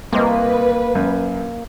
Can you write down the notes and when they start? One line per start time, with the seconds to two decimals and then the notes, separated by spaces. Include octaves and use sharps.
0.13 C2 A#3 B4 C5 D#5
0.95 F#2